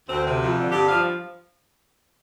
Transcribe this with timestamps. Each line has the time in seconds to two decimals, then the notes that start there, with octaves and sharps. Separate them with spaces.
0.09 D2 C4
0.25 C3
0.41 F2
0.56 D3
0.72 G2 G4
0.88 F3 F5